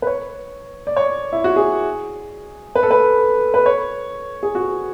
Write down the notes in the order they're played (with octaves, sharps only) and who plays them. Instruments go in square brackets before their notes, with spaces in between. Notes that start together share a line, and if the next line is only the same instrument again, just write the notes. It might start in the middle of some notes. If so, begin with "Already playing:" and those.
[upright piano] B4
C#5
D5
C#5
E4
F#4
G#4
B4
A4
B4
B4
C#5
G#4
F#4